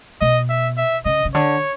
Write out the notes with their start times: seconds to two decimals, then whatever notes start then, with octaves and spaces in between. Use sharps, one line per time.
0.21 B2 D#5
0.49 E5
0.78 E5
1.05 C#3 D#5
1.25 C#3
1.34 D3 C#5